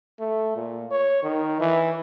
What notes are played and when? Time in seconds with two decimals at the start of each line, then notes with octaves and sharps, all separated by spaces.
0.19 A3
0.56 A#2
0.91 C#5
1.23 D#3
1.60 E3